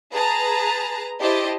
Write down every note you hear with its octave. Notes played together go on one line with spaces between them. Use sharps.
G#4 B4 A5 A#5
E4 G4 C5 D#5 A5